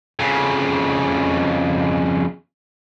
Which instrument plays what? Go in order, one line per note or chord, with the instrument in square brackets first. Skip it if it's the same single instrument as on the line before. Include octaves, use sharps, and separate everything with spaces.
[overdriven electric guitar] F2 C#3